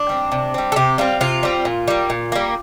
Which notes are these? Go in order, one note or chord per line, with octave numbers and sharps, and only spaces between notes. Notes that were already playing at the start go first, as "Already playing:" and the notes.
Already playing: D4
G3 C4
C3
G3 C4
A4
C3 G4
G3 C4 F4
C3 F4
G3 C4
A#2
G3 A#3
A#2
G3 A#3